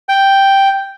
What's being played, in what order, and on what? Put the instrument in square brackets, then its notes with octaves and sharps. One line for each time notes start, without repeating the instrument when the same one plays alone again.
[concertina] G5